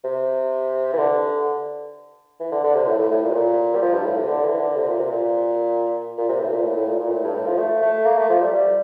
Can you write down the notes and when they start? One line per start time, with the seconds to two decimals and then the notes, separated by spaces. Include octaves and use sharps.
0.04 C3
0.93 E3
0.98 D3
2.40 E3
2.51 D3
2.63 D3
2.75 C3
2.87 A2
2.99 A2
3.11 A2
3.23 A#2
3.30 C3
3.34 A#2
3.75 G3
3.82 F3
3.94 G2
4.05 A2
4.16 C3
4.28 D3
4.44 E3
4.60 D3
4.76 C3
4.88 A#2
4.99 C3
5.11 A#2
6.18 A#2
6.28 C3
6.40 A2
6.48 C3
6.52 A#2
6.63 A2
6.76 A2
6.88 A#2
6.99 A#2
7.11 A2
7.24 G2
7.35 A2
7.46 F3
7.58 A3
7.82 A3
8.05 A#3
8.17 A3
8.29 F3
8.41 G3
8.53 G3